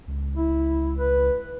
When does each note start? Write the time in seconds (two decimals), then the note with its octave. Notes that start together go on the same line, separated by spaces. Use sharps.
0.08 C#2
0.37 E4
0.99 B4